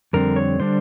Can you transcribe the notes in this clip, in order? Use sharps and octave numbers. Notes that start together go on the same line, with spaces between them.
F2 D3 G3 C4 A#4
C#5
D3 G3 D4 C5